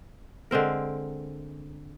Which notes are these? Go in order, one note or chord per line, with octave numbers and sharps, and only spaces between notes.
D3 G#3 C4 A#4